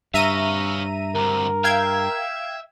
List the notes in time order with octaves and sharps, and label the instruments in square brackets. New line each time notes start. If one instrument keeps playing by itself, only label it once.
[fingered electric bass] G2 [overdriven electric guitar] C#5 F5 [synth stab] E5 A#5 D#7
[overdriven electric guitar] D2 C3 [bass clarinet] A#4
[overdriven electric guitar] E5 [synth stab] F5 G5 G#6